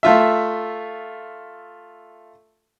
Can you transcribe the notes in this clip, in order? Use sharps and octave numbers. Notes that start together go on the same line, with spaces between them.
A3 F4 E5